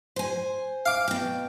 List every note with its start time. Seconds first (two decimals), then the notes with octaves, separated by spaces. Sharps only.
0.16 C5 G#5
0.86 F5 D6
1.08 B2 G5